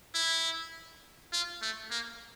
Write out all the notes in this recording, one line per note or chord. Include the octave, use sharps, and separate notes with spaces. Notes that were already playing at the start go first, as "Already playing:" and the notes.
E4
F4
A3
A#3